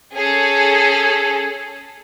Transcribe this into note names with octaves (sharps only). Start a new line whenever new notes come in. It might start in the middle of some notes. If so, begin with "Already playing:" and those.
C#4 G#4 A4